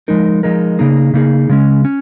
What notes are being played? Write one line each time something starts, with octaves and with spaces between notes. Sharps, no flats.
F3 G#3 D#4 A#4
F3 G#3 D#4 A#4
C#3 A#3 D#4 G#4
C#3 A#3 D#4 G#4
C#3 G#3 C#4
C#4